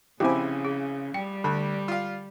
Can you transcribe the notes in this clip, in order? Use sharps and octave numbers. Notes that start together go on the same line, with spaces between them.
A#1 C#3 C4 E4 G4 G#5
G#4
G3 G5
D2 D3
F4 F5